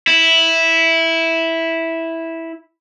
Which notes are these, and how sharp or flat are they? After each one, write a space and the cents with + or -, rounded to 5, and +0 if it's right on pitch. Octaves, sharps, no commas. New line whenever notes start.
E4 -5